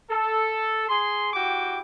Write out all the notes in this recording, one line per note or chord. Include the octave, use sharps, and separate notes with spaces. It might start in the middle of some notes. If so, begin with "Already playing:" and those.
A4
G#4 C6
E4 F#4 G4 G5 D6